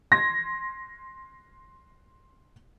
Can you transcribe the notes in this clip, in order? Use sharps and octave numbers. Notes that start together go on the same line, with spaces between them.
C6 G#6 A#6